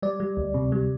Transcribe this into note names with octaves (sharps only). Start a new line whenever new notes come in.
G3 D5
G3
D2
C3
G3